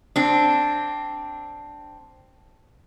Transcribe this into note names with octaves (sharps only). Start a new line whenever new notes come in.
C4 D4